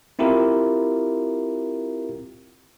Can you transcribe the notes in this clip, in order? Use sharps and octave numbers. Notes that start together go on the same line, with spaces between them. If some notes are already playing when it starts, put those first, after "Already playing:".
C4 E4 F4 G4 A#4